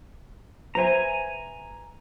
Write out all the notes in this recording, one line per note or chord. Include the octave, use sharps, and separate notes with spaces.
B4 C5 E5 G#5 A#5